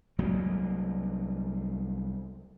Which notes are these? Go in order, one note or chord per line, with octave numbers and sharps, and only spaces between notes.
C2 F#3 G#3 A#3